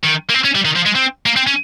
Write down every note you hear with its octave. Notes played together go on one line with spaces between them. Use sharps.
D#3
A#3
C4
C#4
G3
D#3
F3
G#3
C4
A#3
C4
C#4